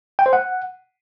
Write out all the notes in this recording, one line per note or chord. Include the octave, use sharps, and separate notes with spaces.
G5
C5
F#5